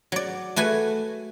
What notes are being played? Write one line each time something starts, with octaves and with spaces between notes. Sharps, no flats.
F#3 D5
A3 F#4 B4 G#5